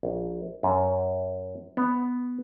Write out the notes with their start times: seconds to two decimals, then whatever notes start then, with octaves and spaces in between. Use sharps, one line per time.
0.03 A#1
0.63 F#2
1.77 B3